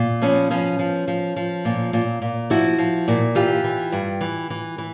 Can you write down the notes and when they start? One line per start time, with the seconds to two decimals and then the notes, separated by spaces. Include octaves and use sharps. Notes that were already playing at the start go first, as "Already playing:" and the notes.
Already playing: A#2
0.22 F3 B3 C#4
0.50 F3 B3 C#4
0.79 F3
1.08 F3
1.36 F3
1.65 A#2
1.93 A#2
2.22 A#2
2.50 F3 E4 F#4
2.78 F3
3.08 A#2
3.35 E3 F4 G4
3.64 E3
3.92 G2
4.21 E3
4.50 E3
4.78 E3